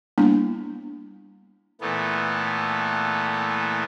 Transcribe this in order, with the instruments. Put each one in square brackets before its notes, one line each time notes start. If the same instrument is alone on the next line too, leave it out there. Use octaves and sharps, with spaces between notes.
[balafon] G3 A#3 B3 D4 E4
[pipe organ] A#2 E3 A3 B3